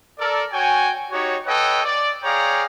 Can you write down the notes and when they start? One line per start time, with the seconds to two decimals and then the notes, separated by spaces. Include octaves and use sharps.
0.19 A4 A#4 D5
0.52 F#4 C#5 G5 G#5
1.11 D#4 F#4 G4 C#5
1.46 A4 B4 C#5 D#5 F#5 G5
1.84 D5
2.23 G#4 C#5 D5 F5 G5 A#5